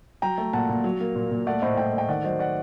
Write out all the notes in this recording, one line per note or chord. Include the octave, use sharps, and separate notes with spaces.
F#3 G5 A#5
A3
A#2 F#5 A5
A#2
F#3
A#3
A#2
A#2
A3 D5 F#5
A2 C5 D#5
A2 D#5 G5
A3
D#5 G5
D#3 D5 F#5
F#3 C5 D#5
D5 F#5